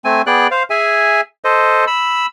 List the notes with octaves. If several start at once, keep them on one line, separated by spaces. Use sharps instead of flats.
A3 C4 G#5
B3 G#4 D5 G5 F#6
C5 F5
G#4 E5 G#5
A4 C5 D#5
B5 E6